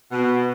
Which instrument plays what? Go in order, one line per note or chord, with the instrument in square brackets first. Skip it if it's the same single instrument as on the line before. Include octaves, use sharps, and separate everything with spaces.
[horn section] B2